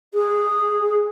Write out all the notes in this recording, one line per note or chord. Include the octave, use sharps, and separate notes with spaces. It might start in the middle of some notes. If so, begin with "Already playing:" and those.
G#4